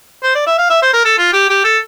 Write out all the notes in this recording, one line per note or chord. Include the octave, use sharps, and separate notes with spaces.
C5
D5
E5
F5
E5
C5
A#4
A4
F4
G4
G4
A4